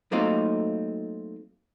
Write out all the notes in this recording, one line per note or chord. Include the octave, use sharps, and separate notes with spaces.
F#3 A3 A#3 C4 D#4 F4